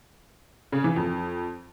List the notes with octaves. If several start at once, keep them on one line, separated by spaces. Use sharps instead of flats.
C#3
E3
F2